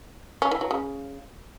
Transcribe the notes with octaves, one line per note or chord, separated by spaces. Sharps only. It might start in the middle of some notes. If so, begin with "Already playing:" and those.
C#4
E3
F#3
C#3